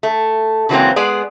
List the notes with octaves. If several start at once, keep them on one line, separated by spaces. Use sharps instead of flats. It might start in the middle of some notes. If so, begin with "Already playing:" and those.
A3
C#3 E3 F#3 G#3 A#3 C4
G#3 B3 G#4 D5